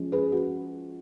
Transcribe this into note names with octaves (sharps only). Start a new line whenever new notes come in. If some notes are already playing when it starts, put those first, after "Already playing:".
Already playing: F3 G#3 C#4
G#4 B4
F#4